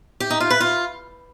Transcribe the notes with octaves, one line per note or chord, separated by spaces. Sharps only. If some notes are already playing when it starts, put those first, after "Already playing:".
G4
D#4
F4
B4
F4